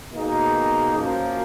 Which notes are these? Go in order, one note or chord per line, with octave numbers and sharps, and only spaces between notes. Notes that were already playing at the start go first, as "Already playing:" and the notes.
B2 A#3 D#4 G#4
F#2 F3 A#3